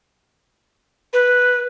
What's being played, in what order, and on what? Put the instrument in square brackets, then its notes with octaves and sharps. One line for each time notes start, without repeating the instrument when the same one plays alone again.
[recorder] B4